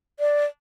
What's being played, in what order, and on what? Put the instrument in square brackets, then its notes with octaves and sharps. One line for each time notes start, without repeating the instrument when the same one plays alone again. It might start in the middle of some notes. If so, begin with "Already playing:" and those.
[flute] D5